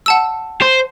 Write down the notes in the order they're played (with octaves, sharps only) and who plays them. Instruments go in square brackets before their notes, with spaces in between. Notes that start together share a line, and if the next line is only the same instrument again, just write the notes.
[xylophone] F#5 A5 E6
[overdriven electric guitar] C5